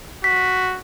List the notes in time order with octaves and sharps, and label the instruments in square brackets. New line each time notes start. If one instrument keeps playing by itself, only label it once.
[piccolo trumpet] F#4 [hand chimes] B6